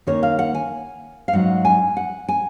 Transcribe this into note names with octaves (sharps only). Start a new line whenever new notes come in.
D#2 D#3 A#3 C#4 C#5
F5
F#5
G#5
F5
G#2 F#3 C#4 F#5
G#5
F#5
G#5